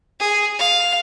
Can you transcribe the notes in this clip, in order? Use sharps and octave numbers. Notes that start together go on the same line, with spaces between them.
G#4
F5